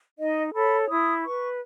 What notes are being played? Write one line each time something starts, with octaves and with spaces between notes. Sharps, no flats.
D#4 D#5
A4 C#5 B5
E4 D#6
B4 C#6